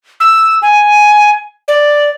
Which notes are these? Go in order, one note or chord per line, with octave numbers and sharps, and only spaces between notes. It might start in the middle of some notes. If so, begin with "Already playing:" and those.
E6
G#5
D5